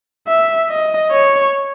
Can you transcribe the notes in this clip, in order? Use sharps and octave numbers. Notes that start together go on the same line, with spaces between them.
E5
D#5
C#5